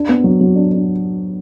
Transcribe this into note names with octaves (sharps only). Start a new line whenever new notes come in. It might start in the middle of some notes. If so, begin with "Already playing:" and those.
Already playing: D4
B3
F#3
F#3
D4
D4